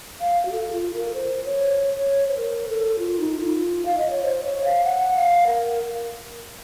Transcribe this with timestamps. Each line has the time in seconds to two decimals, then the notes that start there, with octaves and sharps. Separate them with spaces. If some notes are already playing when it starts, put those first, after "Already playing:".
0.21 F5
0.45 F#4
0.52 A4
0.73 F4
0.94 A#4
1.14 C5
1.45 C#5
2.28 C5
2.37 A#4
2.69 A4
2.99 F4
3.20 D#4
3.40 F4
3.85 F5
3.98 D#5
4.10 C#5
4.23 C5
4.44 C#5
4.64 F5
4.84 F#5
5.16 F5
5.47 A#4